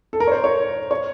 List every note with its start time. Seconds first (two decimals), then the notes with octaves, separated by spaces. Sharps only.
0.13 A4
0.20 A#4
0.27 C#5
0.32 C5
0.44 C#5
0.91 C#5